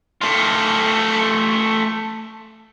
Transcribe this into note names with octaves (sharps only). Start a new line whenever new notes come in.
A3 F4